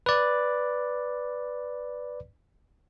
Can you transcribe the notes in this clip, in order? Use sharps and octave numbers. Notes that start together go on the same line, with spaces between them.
B4 D5